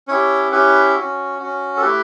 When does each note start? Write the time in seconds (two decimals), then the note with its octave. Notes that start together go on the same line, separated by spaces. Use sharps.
0.08 C#4 E4 G4 C#5
0.52 C#4 E4 G4 B4
0.95 C#4 F#4
1.39 C#4 F#4
1.77 A4
1.81 A3 E4 G4 B4